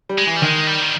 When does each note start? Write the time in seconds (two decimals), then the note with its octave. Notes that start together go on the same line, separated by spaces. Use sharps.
0.09 G3
0.18 G#3
0.26 E3
0.36 G3
0.42 D#3 G#3
0.67 G3
0.81 D#3